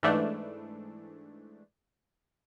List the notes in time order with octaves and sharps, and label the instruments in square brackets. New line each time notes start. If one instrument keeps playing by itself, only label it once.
[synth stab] G#2 E3 A3 D4